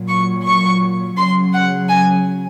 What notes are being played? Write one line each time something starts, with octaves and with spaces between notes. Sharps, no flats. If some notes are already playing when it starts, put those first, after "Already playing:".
Already playing: A#2 F#3
C#6
C#6
C#3 F#3 C6
F#5
G#5